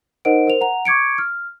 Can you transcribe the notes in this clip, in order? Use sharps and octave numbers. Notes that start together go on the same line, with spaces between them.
D#4 A#4 C5 D#5 F#5 D7
A#4 C5 F7
F#5 A#5 F7
C#6 D6 G#6 C#7 D7
F6